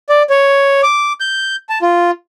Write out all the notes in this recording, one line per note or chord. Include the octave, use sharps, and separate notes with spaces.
D5
C#5
D6
G6
A5
F4